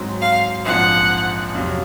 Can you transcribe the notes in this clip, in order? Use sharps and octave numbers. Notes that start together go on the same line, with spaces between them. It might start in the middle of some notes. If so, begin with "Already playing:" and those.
Already playing: G#2 F#3 C4
F5
A#1 G#2 F3 C4 F#5
F2 C3 F#3